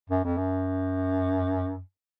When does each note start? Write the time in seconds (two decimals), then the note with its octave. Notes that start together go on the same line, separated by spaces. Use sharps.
0.10 F#2
0.24 F2
0.38 F#2